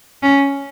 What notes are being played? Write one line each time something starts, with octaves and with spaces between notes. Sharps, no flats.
C#4